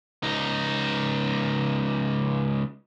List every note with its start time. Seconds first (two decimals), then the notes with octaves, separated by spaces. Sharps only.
0.23 C#2 D#4